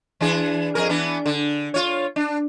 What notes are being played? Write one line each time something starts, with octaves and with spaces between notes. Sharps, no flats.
E3 D4 G#4
F2 G#4 A#4
E3 B3 D4
D3
F4 C#5
D4